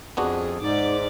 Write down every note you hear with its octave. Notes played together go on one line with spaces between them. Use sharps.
F2 B3 D4 F#4 G#4
G#2 D#4 D5 D6